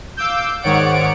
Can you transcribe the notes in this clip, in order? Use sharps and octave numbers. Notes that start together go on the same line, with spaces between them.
F5 D6 E6 G6
G#2 D#3 C#5 D5 F#5 D7